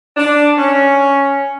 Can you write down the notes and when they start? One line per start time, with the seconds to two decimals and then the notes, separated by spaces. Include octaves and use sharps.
0.17 D4
0.58 C#4